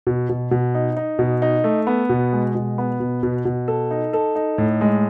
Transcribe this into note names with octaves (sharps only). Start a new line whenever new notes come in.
B2
B2
B2
D#4
D#4
B2
D#4
A3
B3
B2
G#3
B2
B3
B2
B2
B2
A4
D#4
A4
D#4
A2
G#3